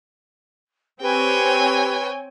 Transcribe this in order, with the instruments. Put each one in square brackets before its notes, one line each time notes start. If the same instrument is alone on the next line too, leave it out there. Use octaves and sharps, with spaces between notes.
[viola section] C4 C#5 [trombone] G4 [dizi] B4 [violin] G5 G#5